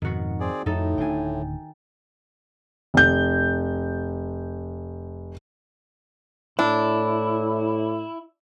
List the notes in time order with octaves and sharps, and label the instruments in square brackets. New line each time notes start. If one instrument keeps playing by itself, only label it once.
[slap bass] F2 G#2 B2 [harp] D#3 F#4
[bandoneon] C4 G#4 D5
[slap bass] F2 [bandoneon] A2 [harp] D#4 A4
[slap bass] D1 D4 [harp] G5 G#5
[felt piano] F1 G6
[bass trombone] A2 [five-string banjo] D4 [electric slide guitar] E4